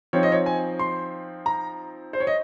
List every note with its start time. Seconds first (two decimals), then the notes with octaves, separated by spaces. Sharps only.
0.13 F3 C4 D#4 C#5
0.23 D#5
0.32 C#5
0.46 G#5
0.79 C6
1.46 A#5
2.13 C5
2.20 C#5
2.27 D#5